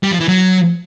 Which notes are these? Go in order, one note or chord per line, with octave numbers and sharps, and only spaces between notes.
G3
F3
E3
F#3